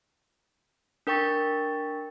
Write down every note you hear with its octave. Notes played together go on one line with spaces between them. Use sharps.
D4 A#4 G5 C#6 A6